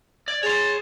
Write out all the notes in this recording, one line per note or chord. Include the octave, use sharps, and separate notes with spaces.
D5 G#6
G#4 C#5 C6 A6